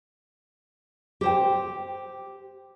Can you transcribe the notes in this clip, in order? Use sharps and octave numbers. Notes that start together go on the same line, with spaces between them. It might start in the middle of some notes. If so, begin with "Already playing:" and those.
G4 C5 G5